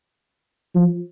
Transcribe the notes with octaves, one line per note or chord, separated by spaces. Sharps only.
F3